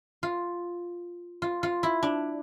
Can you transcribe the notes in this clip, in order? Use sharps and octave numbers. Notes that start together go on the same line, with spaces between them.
F4
F4
F4
E4
D4